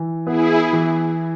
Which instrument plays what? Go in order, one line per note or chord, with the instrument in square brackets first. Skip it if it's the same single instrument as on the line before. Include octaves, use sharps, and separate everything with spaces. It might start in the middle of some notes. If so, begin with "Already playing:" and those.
Already playing: [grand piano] E3
[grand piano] B3 [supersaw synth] E4 G#4
[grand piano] E3